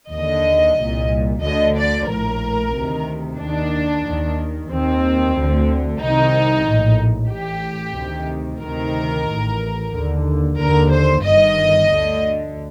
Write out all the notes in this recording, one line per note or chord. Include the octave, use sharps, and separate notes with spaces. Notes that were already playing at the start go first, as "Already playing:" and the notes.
D#2 D3 D#5
C2 A#2
D2 D3 D#5
D5
A#1 A2 A#4
D2 C3 D#3
D#2 D#3 D4
D#2 D#3
D#2 D#3 C4
D2 D3
C2 C3 D#3 D#4
A#1 A2
A1 A2 G4
D2 C3 D#3
D2 C3 D#3 A#4
A1 A2
D#2 D3
D#2 D3 A#4
C5
G1 G2 D#3 D#5
D2 D3